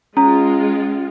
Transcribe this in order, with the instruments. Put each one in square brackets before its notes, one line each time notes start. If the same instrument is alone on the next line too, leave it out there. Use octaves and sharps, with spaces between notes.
[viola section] G#3 F4 [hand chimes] C#4 [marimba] A#5